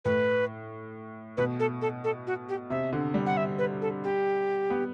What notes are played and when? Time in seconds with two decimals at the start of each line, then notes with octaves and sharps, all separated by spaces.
0.05 A2 B4
1.37 B2 B4
1.59 A4
1.81 A4
2.04 A4
2.27 F#4
2.49 G4
2.70 C3 E5
2.93 D3
3.14 G3
3.26 F#5
3.37 E5
3.58 B4
3.82 A4
4.04 G4
4.70 B3